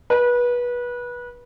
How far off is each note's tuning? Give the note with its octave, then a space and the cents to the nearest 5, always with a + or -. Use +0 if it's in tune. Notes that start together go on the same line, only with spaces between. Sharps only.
B4 -25